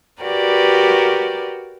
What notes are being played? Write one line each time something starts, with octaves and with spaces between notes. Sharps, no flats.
F#4 G4 A#4 B4 D5